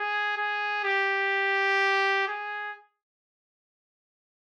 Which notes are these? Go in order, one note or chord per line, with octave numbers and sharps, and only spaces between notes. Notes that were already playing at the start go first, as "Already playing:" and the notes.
Already playing: G#4
G#4
G4
G#4